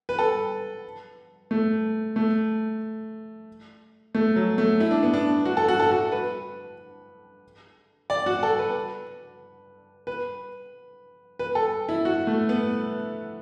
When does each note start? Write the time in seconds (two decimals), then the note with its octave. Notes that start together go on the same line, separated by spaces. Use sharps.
0.09 B4
0.19 A4
1.51 A3
2.16 A3
4.15 A3
4.36 F#3
4.58 A3
4.80 E4
4.91 D4
5.03 B3
5.14 D4
5.46 F#4
5.57 A4
5.68 F#4
5.80 A4
5.91 F#4
6.12 B4
8.10 D5
8.26 F#4
8.43 A4
8.59 B4
10.07 B4
11.39 B4
11.55 A4
11.89 E4
12.05 F#4
12.27 A3
12.49 B3